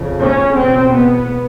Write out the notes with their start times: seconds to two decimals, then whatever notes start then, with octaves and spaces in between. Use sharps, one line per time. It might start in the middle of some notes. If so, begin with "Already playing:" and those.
Already playing: F2 C#3
0.20 C#4
0.57 E2 B2 C4
0.93 B3